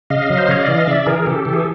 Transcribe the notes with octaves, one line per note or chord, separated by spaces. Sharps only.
C#3 D#5 F5
F#3
C5
C#3 C#5
D5
E3
D#5
C#3 D5 E5
E3 G#4 A#4
C#3 G4 A4
E3
G#4